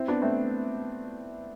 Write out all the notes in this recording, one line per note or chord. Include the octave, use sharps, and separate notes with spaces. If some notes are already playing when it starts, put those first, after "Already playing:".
Already playing: C4 E4
B3 D4
A3 C4